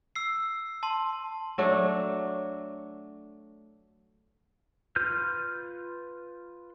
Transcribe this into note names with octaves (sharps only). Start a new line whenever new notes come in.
E6 C7
A5 C6
F#3 A3 D4
F4 B4 F6 G6